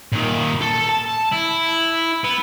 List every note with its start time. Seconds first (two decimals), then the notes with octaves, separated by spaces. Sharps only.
0.12 A#2 D#3
0.61 A4
0.89 A5
1.32 E4
2.25 B3